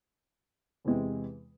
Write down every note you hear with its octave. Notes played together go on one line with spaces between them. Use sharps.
E2 C3 E3 G#3 C4